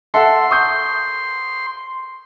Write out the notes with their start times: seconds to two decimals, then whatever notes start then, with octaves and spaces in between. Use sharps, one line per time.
0.14 A4 E5 F#5 C6
0.51 C#6 D#6 G6